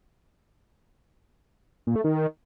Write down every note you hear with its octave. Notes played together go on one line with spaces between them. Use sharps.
A#2
A3
D#3